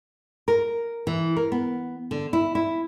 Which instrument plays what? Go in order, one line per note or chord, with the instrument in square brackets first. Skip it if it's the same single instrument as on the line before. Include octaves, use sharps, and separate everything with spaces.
[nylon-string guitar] A#4
E3
A#4
B3
D3
E4
E4